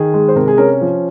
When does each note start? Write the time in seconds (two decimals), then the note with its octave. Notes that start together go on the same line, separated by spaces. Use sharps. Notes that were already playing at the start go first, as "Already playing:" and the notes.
Already playing: D#3 G#4
0.14 G#3
0.28 C5
0.36 C3 A#4
0.48 G#4
0.58 C#4 A#4
0.81 F3